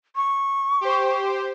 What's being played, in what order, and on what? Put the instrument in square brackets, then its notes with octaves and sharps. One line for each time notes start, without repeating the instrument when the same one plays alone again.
[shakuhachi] C#6
[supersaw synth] G4 C5